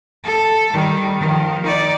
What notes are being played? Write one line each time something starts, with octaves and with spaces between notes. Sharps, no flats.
A4
D#3 G3
D#3 F3
D#4 D5